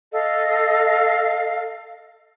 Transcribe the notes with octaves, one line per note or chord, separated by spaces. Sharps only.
A4 D#5 F5